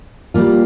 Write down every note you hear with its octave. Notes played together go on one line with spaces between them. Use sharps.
G3 A#3 F4